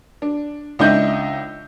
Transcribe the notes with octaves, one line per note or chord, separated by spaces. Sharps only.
D4
C#2 D4 D#4 D#5 E5 G6